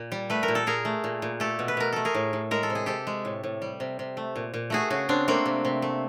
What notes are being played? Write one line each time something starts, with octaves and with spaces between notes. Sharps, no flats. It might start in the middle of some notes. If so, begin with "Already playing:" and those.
Already playing: A#2
G3
A3 B4
A#4
A#2
A4
A#2 G#4 A#4
A3
A#2
A#2
A3 G4 A4
B2
B4
B2 A#4
A3 A4
G#4 A#4
A2
A2
G#3 A#4
A4
C3
G#4
C3 G4 A4
G#3
A2
A2
G3
C3
C3
A3
A#2
A#2
A3 F#4 G#4
C#3 F#4 G#4
C#3 C4 D4
A3 A#3 C4
C3
C3
A3